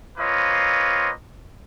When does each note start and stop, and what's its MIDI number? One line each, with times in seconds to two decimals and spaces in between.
0.18 1.11 58
0.18 1.11 60
0.18 1.11 65
0.18 1.11 71
0.18 1.11 73
0.18 1.11 75